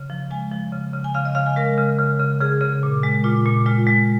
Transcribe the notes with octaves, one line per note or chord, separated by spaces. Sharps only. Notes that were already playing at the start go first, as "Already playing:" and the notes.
Already playing: C#3
F3
G#3 G#5
F3
C#3
C#3
G#5
C#3 F5
D#5
C#3 F5
G#5
G#3 A#4
C#3
C#3
C#3
C#3 G#4
C#3
A#2
G#3
A#2 F4
A#2
G#3 F4
G#3